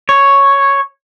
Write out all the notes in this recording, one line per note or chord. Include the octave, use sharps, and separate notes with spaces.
C#5